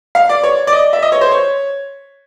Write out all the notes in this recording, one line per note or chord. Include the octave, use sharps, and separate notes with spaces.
F5
D5
C#5
D5
D#5
E5
D#5
C#5
C5
C#5